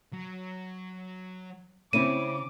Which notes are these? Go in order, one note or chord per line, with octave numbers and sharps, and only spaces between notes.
F#3
C#3 C4 C#4 E4 D6 D#7